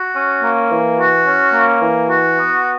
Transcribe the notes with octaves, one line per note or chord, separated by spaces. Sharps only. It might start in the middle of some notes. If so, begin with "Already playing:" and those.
Already playing: F#4
C#4
A#3
E3
F#4
C#4
A#3
E3
F#4
B3